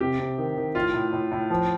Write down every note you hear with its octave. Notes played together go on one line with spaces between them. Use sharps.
C3 G4
C3
D#3
D#3
A2 F4
A2
A2
A2
F3